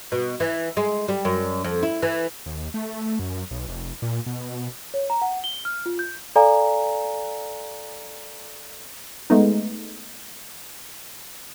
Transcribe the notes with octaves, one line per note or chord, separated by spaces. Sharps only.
B2
E3
G#3
G3
F#2
F2
E4
E3
D#2
A3
F#2
B1
F1
A#2
B2
C#5
A#5
F#5
G7
F6
F4
G6
A4 D5 F5 G#5 A#5
G#3 A3 B3 D#4